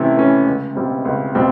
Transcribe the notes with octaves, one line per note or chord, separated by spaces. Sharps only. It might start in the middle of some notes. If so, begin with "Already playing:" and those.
Already playing: C3 E3 A3 C#4 E4
E3 A3 C#4 E4
C#2
B2 G3 C4
C#2
B2 G3 C4